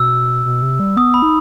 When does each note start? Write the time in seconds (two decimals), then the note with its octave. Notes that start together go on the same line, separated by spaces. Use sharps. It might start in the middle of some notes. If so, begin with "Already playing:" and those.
Already playing: B2 E6
0.45 B2
0.62 C3
0.80 G3
0.97 B3 D#6
1.14 B5
1.22 D#4